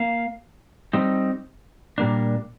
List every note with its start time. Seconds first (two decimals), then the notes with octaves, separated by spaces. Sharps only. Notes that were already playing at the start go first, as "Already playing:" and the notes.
Already playing: A#3 F5
0.93 G3 C4 D#4
1.98 A#2 G3 A#3 D4